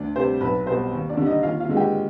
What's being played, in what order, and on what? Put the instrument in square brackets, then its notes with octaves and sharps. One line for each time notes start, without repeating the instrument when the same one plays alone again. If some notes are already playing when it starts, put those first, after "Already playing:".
Already playing: [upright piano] D2 D4 D5
C3 G3 C5
B1 B4
B2 G3 C5
D#2
D4 D5
D3 G3
D#4 D#5
D#2 F4 F5
F4 F5
D3 G#3
G4 G5